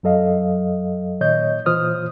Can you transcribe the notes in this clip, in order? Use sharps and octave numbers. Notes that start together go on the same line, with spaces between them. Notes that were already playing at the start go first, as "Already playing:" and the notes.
F#2 F#3 A4 D#5 F5
A#2 D#3 C#5 D#5 G6
A#2 E3 F4 C5 D#6 F6